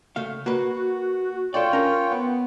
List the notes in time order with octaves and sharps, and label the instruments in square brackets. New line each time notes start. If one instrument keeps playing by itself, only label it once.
[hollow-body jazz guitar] C#3 A3 F5
[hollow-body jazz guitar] A#3 B4 [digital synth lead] F#4
[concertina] F4 G5 [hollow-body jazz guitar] A4 D5 [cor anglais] C#5
[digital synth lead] C#4 [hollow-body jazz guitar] A#4 A#5
[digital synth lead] B3